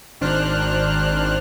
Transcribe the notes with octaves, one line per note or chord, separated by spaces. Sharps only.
G#1 D#3 D4 C5 F6 F#6